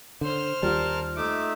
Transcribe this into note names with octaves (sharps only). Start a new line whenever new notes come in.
D3 C5 F6
D#2 G3 F4 G4 A#4 F5 A5
A3 D#4 E5 D6